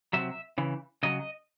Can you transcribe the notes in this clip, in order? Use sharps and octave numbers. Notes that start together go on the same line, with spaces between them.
C3 F#3 E5
C#3 E3
C#3 F#3 D#5